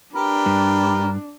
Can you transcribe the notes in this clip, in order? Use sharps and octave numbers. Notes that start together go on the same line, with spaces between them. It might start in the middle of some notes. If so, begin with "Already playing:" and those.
D4 G4 A#4 B4
G2